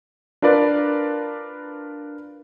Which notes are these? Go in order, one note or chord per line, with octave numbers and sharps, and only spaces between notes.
D4 F4 A#4 B4 D5